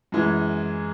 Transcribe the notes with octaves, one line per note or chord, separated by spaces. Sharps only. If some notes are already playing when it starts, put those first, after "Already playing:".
F#2 E3 G#3